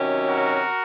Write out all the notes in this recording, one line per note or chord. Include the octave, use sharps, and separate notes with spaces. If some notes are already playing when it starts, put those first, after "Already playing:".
Already playing: C3 D#3 F#3 C#4
F#4 A#4